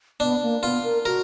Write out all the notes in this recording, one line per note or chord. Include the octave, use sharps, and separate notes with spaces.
B3 D4
A#3
B3 F4
A#4
F#4 A#4